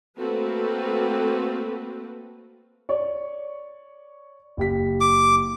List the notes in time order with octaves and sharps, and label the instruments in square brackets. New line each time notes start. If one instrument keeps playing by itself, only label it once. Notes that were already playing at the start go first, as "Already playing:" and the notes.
[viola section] A3 A#3 C4 F#4 A4 B4
[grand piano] C#5 D5 C#6
F#1 G4 B6
[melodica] D6